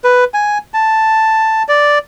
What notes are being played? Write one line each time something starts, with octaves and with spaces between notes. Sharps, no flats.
B4
G#5
A5
D5